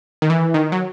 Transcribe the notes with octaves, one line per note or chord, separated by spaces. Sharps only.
D#3
E3
D#3
F#3